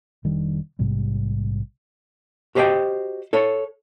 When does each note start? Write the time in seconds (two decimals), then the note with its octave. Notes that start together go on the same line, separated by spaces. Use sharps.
0.24 F1 D#3 G3 D4
0.79 A#1 G#2 C3 G3
2.55 F#4 G4 C5 D5 D#5 G5
3.33 A4 C#5